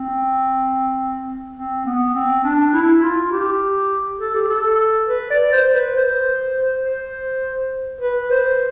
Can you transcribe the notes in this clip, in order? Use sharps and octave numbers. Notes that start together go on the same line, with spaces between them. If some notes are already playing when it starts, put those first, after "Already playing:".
Already playing: C4
C4
B3
C4
D4
E4
F4
G4
A4
G4
A4
B4
D5
C5
B4
C5
C5
B4
C5